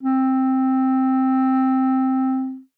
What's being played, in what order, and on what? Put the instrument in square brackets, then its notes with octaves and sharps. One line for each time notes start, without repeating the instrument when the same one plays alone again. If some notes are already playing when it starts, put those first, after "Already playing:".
[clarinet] C4